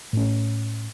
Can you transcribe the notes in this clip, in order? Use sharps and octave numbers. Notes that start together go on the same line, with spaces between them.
A2 C#4